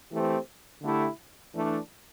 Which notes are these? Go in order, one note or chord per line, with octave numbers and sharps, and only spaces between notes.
E3 A3 C4 G4
D3 A3 E4 G4
E3 A3 D4